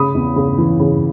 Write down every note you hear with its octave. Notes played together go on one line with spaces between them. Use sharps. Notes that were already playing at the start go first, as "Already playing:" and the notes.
Already playing: C#3 B5 D#6
E2
C#3
E3
C#3